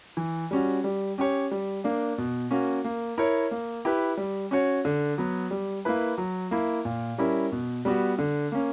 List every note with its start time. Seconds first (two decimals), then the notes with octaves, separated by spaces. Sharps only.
0.17 E3
0.51 G3 C#4 F#4
0.84 G3
1.18 C#4 G4 C#5
1.51 G3
1.84 A#3 D4
2.18 B2
2.51 A#3 C#4 F#4
2.85 A#3
3.18 E4 A#4 C#5
3.51 A#3
3.85 E4 G4 B4
4.17 G3
4.51 C#4 F#4 C#5
4.85 D3
5.18 F#3 B3
5.51 G3
5.85 A#3 E4 B4
6.18 F#3
6.51 A#3 E4
6.85 A#2
7.18 G3 C#4 E4 A#4
7.52 B2
7.85 G3 B3 F#4
8.19 D3
8.52 A#3 C#4